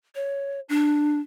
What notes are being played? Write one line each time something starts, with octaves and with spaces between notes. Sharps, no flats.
C#5
D4